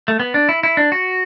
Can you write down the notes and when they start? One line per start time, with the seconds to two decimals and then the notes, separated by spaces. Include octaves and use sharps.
0.08 A3
0.20 B3
0.34 D4
0.49 E4
0.63 E4
0.77 D4
0.92 F#4